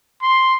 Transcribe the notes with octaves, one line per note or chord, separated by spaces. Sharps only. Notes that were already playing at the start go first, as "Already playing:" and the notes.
C6